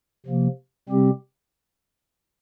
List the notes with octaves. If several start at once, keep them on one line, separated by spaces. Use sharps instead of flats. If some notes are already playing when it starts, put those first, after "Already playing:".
C3 F3 A#3
C3 G3 C4 G4